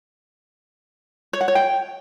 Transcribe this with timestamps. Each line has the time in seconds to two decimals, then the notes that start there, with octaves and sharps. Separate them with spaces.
1.33 C#5
1.41 F#5
1.48 C#5
1.55 G5